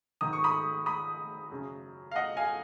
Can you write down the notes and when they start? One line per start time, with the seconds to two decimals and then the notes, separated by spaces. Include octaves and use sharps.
0.21 G#2 D#3 D#6
0.33 C#6
0.44 B5 D#6
0.86 B5 D#6
1.51 F#2 C#3
2.11 F5
2.16 D#5 F#5
2.37 F5 G#5